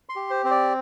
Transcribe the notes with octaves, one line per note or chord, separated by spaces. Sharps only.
C6
G4
C5
C4 C5
D5